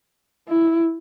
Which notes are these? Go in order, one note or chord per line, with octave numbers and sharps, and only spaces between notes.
E4